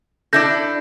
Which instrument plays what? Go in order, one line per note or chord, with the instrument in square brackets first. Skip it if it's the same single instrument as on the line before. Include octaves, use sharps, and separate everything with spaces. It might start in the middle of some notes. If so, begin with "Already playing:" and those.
[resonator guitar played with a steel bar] D4 E4 A4 [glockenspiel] G6 A#6